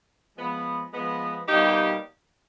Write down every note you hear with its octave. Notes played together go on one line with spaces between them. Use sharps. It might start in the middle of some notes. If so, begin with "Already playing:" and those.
F3 G#3 B3
F3 G#3 B3
B2 G3 A#3 D#4 G4